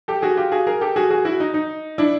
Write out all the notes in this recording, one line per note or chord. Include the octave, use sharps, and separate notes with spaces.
G4 A4
F#4 G#4
F4 G4
F#4 G#4
G#4 A#4
G4 A4
F#4 G#4
F#4 G#4
E4 F#4
D#4
D#4
D4 E4